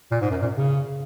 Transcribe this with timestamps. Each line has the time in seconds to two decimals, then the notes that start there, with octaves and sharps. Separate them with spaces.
0.11 A#2
0.21 G#2
0.31 F#2
0.42 A#2
0.57 C#3